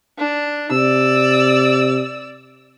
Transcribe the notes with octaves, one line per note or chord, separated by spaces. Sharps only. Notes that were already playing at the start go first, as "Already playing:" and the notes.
D4
C3 D5 E6